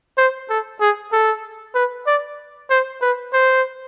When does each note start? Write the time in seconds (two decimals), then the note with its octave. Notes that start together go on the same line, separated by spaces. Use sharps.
0.18 C5
0.50 A4
0.81 G#4
1.13 A4
1.75 B4
2.07 D5
2.70 C5
3.02 B4
3.33 C5